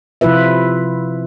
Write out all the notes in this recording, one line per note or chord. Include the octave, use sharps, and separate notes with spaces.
C3 F3 E4 F4 B4 E5